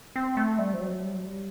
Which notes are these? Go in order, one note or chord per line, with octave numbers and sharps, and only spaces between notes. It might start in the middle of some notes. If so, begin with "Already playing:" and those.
C4
A3
G3
F3
F#3
G3
F#3
G3